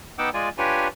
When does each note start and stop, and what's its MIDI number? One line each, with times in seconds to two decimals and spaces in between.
0.19 0.30 59
0.19 0.30 63
0.19 0.30 78
0.19 0.30 79
0.19 0.30 86
0.19 0.30 88
0.34 0.49 56
0.34 0.49 65
0.34 0.49 74
0.34 0.49 80
0.58 0.88 62
0.58 0.88 65
0.58 0.88 67
0.58 0.88 71
0.58 0.88 73
0.58 0.88 80